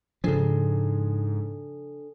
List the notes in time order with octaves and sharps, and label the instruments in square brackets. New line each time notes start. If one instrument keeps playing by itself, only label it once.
[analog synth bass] G#2 [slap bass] C#3 F3 [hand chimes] D4 A4